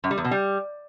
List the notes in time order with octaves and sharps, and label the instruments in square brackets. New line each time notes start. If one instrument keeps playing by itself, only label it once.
[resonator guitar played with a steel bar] F#2
G3
E2
B2
G3